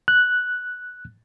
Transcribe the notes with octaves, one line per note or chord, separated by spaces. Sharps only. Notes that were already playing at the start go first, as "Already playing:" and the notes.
F#6